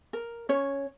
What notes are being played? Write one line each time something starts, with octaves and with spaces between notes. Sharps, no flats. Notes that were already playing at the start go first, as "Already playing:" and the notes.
A#4
C#4 C#5